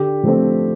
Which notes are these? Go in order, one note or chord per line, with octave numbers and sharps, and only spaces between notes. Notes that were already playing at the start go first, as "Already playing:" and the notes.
Already playing: D3 G4
F3 A3 C4